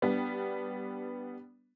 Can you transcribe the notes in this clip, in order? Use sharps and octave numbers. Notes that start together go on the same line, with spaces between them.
G3 B3 D4